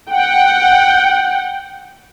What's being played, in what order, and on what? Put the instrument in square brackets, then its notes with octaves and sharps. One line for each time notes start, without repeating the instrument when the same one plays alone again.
[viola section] F#5 G5